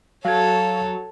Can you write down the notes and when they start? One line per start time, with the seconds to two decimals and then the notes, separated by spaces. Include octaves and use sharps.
0.25 F#3 A4 C#5 F5 G#6